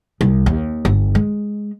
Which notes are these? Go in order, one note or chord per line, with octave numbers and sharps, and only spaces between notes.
C2
D#2
G1
G#3